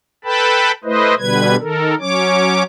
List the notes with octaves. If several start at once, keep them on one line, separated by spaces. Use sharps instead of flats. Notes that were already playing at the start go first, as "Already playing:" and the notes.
A4 B4 G5 A5 B5
A3 E4 B4 C5 D#5
B2 D3 G3 B4 G#6
D#3 A4 A#4
F#3 C#4 C#5 D6